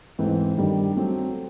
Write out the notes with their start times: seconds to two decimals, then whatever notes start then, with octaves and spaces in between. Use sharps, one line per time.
0.19 G#2 E3 A3 C4
0.57 G2 D#3 G3
0.96 F#3 A3 C4